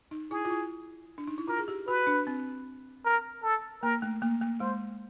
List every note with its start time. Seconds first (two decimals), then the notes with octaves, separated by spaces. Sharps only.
0.11 D#4
0.31 E4 G#4
0.45 F4
0.51 E4
1.18 D4
1.27 D#4
1.38 E4
1.48 F4 A#4
1.58 G#4
1.68 G4
1.87 F#4 B4
2.07 D4
2.27 C4
3.05 A#4
3.43 A4
3.82 A#3 A#4
4.02 A3
4.22 A#3
4.41 A#3
4.60 G#3 C5